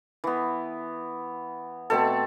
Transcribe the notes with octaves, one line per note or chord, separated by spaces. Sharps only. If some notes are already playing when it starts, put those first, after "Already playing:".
E3 B3
B2 A3 C4 A4